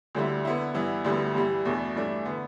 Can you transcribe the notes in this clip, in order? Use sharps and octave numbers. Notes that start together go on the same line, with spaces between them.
D2 D3 G3 E4
D3 B3 E4
G2 E3 B3 E4
D2 D3 G3 B3 E4
G2 E3 G3
E2 B2 A3 D4
G2 E3 A3 D4
D3 B3